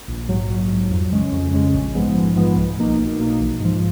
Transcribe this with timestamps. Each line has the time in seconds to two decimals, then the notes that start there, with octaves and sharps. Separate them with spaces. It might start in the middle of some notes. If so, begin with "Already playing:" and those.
0.08 A#1
0.29 G#2 F#3
0.49 A#1
0.71 G#2 F#3
0.91 F2
1.12 C#3 G#3 C#4
1.32 F2
1.53 C#3 G#3 C#4
1.74 A#1
1.95 G#2 F3 G#3 B3
2.15 A#1
2.36 G#2 F3 G#3 B3
2.57 B1
2.77 B2 A#3 D#4
2.99 B1
3.19 B2 A#3 D#4
3.40 A#1
3.60 G#2 F3